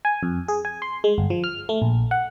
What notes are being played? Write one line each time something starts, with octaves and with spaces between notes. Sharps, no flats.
G#5
F2
G#4
G#5
C6
G#3
G1
F3
F6
A3
A#1
F#5